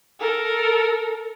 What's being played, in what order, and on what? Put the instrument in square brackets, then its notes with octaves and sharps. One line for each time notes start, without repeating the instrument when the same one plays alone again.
[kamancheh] A4 A#4